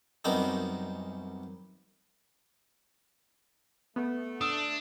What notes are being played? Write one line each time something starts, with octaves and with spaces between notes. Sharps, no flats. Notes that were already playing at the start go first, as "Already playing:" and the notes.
C2 F#2 B3 C4 D4 D#4
A3 B3
D4 D#6 E6